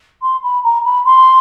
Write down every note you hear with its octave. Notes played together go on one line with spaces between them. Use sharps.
C6
B5
A#5
B5
C6